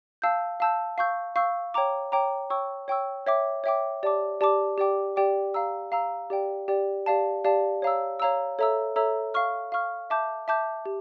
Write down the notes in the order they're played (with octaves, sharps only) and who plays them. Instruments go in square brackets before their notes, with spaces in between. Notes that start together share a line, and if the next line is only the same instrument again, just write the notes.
[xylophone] F5 A5 E6 G6
F5 A5 E6 G6
F5 C#6 E6 G6
F5 C#6 E6 G6
C#5 G5 A#5 D6
C#5 G5 A#5 D6
C#5 G5 C#6 E6
C#5 G5 C#6 E6
C#5 E5 G5 D6
C#5 E5 G5 D6
G4 D5 A5 D6
G4 D5 A5 D6
G4 D5 G5 D6
G4 D5 G5 D6
F5 A#5 E6
F5 A#5 E6
G4 D5 G5
G4 D5 G5
G4 D5 F5 A5
G4 D5 F5 A5
C#5 F5 A#5 E6
C#5 F5 A#5 E6
A4 C#5 E5 A#5 E6
A4 C#5 E5 A#5 E6
F5 C#6 F6
F5 C#6 F6
E5 A5 D6 G6
E5 A5 D6 G6
G4